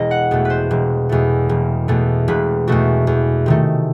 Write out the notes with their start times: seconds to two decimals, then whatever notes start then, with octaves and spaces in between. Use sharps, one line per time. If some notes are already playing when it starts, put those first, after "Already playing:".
Already playing: E1 D#5
0.11 F#5
0.31 E2 B2 A3
0.45 B4 C5
0.71 E1
1.09 E2 B2 A3
1.49 E1
1.88 E2 B2 A3
2.28 E1 B4
2.67 E2 B2 A3 F#4
3.07 E2
3.46 C3 D#3 A3